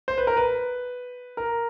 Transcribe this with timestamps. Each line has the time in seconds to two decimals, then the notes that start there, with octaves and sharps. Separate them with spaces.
0.08 C5
0.18 B4
0.27 A#4
0.37 B4
1.37 A#4